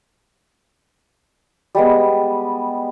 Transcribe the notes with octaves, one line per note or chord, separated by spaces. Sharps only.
G3 G#3 B3